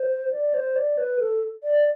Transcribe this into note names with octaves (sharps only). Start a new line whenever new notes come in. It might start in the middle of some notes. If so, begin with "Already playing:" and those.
Already playing: C5
D5
C5
D5
B4
A4
D5